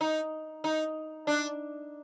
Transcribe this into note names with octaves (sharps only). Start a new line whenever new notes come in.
D#4
D#4
D4